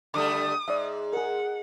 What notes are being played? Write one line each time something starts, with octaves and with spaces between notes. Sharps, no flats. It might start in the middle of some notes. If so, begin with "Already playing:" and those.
D3 G3 A3 D#6
G#2 D5 E5
G#4 A#4 F#5